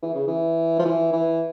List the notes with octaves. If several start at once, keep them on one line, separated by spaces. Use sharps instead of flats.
E3
C#3
E3
F3
E3
E3